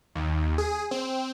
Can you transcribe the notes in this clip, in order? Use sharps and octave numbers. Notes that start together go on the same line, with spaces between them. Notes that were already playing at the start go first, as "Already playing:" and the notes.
D#2
G#4
C4